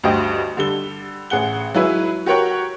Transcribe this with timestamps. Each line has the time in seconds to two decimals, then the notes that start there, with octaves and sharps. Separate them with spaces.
0.04 D2 G2 F#4 C5 D#5 G5
0.57 D3 G3 A4 G7
1.30 A1 G#4 F#5 G7
1.74 F#3 G#3 E4 B4
2.26 F#4 G4 A#4 C#5 F#5 G5